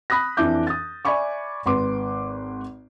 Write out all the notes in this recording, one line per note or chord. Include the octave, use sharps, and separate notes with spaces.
B5 D#6 F#6 A#6
F2 E3 D4 E5 D6 G6
D#6 A6
D5 E5 G#5 B5 C#6 D6
G#1 B4 C6 D6